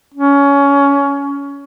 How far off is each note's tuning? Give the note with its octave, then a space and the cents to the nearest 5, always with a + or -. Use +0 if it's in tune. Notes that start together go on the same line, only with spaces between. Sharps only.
C#4 +20